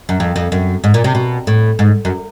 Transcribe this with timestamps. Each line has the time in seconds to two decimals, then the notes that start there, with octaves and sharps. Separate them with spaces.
0.09 F#2
0.20 F2
0.36 F2
0.52 F#2
0.84 G#2
0.94 A#2
1.04 C3
1.15 B2
1.47 A2
1.79 G#2
2.05 F#2